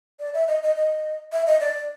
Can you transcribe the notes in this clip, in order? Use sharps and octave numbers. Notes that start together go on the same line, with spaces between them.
D5
E5
D#5
D#5
D#5
E5
D#5
D5